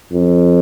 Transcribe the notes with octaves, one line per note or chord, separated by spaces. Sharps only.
F2